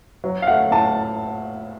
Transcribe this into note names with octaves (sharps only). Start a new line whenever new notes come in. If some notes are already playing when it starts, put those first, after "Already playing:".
F#3
F5
A3 F#5
A2 A5